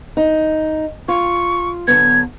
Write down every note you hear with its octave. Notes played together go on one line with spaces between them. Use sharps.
D#4
F4 C#6
D3 F#3 B3 G#6